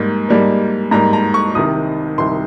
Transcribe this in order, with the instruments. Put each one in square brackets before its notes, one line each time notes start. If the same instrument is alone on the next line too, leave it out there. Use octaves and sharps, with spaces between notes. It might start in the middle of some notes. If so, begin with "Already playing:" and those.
Already playing: [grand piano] G#2 G3 A#3
G#2 G3 A#3
G#2 G3 A#3 A#5
A#5
C#6
C2 C3 D#3 D#6
C2 C3 D#3 C6